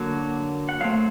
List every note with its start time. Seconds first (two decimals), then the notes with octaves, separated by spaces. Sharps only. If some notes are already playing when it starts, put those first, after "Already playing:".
Already playing: D3 F#3 A#3
0.69 F#5
0.81 F#3 A3 C4 F5